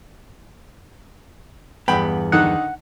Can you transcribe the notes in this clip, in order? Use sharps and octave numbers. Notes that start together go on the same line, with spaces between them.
E2 G2 B3 G5 B5
D3 D#3 D#4 F#5